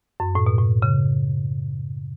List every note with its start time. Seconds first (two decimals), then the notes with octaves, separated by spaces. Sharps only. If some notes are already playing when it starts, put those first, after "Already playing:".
0.20 F#2
0.35 A2
0.46 B2
0.58 A2
0.82 C#3